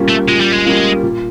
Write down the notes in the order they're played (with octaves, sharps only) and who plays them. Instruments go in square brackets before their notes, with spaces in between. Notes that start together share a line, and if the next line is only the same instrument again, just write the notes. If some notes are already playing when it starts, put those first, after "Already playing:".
Already playing: [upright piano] A#2 G3 A#3 C#4 F4
[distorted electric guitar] A3
[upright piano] A#2 [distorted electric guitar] G#3
[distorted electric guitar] G3
G#3
[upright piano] G3 A#3 C#4 F4
A#2